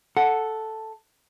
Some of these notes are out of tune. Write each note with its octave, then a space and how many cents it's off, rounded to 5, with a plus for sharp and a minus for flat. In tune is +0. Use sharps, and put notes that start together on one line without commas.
A4 +0 F#5 +0